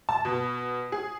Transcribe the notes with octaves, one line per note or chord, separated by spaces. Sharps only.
A5
B2
G#4